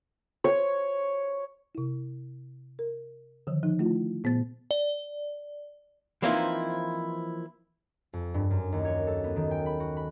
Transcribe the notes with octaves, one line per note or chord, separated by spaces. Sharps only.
C#5
C3 E4
A#4
D3 D#3 F3
F3 D#4
A3 E4 F4
A#2 B3 C5 A6
D5
E3 F3 A#3 C4 D#4 E4
F2
G2
F#2
D#2
C#5
A4
B3
D#3
G5
B5
F#4
B5